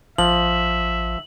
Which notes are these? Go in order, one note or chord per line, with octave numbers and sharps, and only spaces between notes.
A1 F3 E5 F#7